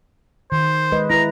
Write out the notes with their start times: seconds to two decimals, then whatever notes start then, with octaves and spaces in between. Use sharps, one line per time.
0.52 D#3 C5
0.92 G#3 B4 D#5
1.10 E4 B4 A#5